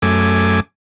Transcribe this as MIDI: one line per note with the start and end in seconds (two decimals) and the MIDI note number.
0.02 0.60 42
0.02 0.60 57
0.02 0.60 80
0.02 0.60 86